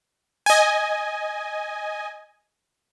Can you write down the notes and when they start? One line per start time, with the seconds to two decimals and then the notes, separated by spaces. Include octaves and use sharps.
0.46 D#5 G#5